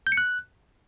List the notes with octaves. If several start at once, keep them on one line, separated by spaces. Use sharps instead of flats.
G6
C#7
F#6